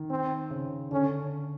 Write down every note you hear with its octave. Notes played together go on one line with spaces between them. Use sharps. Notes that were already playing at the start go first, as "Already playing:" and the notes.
Already playing: D#3
C4
C#3
D3 C#4